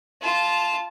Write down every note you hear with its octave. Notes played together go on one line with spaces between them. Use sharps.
F4 A5